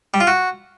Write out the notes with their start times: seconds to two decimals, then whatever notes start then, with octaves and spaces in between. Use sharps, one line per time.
0.14 G3
0.21 F4
0.27 F#4